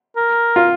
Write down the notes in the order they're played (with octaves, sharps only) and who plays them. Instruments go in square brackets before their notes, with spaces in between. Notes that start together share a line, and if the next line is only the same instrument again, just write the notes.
[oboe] A#4
[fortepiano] F4